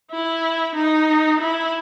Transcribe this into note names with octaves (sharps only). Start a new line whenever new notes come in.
E4
D#4
E4